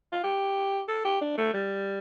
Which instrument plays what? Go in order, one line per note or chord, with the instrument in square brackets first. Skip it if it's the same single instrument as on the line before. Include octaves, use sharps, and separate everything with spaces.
[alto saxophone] F4
G4
A4
G4
D4
A3
G3